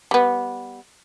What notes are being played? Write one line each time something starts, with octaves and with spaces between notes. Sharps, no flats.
G3 B3